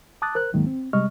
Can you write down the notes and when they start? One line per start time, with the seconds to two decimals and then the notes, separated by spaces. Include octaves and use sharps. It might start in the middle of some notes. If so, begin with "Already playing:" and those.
0.22 A5 D6 D#6 F#6 A6
0.35 A#4 C5 F#6
0.53 D2 G#2 D#3 F#3 G#3 A#3
0.66 C4
0.93 C3 G3 G#3 D#5 C#6 F6